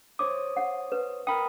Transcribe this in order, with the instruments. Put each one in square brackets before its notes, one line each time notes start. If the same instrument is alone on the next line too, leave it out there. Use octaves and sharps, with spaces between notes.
[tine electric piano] C5 C#5 D#6 [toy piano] D6
[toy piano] F#5
B4
[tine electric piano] A#4 B5 D#6 [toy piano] G5